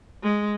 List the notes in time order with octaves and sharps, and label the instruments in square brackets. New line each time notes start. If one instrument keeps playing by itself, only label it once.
[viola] G#3